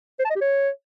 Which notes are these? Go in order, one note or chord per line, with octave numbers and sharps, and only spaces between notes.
C5
A5
D#5
G4
C#5